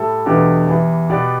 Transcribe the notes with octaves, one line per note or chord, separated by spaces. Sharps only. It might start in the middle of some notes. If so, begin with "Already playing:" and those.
Already playing: A2 G3 E4 A4
E2 B2 A3 D4 G4
E2 E3 G3
B2 B3 G4 D5